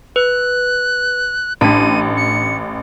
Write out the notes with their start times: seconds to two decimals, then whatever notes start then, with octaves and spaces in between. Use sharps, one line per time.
0.16 B4 F#6
1.61 A1 D4 A5 D#7
2.17 C#7